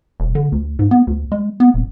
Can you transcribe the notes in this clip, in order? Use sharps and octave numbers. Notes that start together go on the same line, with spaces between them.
E1
D3
D2
G#2
B3
D2
G#3
B3
D#1